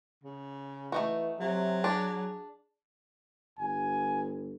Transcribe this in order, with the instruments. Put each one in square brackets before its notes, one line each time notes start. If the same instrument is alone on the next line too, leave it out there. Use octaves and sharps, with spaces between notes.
[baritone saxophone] C#3
[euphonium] E3 [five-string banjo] A3 D#4 F#4
[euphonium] C3 [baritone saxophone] F#3
[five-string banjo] D4 [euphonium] G#4
[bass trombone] G1 [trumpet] G#5